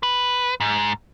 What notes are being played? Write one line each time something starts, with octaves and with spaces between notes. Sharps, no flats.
B4
G#2